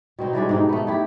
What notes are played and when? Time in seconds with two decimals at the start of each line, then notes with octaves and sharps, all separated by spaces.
0.19 B2 C4 D#4
0.33 E3 G3 G#3 D4
0.49 G#2 B3 D#4 G5
0.69 A3 B3
0.87 A3 E4 G4